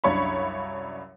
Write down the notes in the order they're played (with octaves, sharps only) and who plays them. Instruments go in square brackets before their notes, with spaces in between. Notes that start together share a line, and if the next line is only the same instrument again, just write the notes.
[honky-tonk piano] C2 F#2 D4 C#5 F5 B5